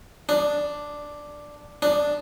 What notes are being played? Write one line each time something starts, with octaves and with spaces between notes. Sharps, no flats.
D4
D4